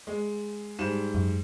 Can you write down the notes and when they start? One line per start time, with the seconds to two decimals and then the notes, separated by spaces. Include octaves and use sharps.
0.07 G#3
0.79 G#2 G3 E7
1.14 F#2